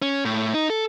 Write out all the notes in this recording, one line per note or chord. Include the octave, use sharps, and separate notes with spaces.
C#4
A2
D#4
A4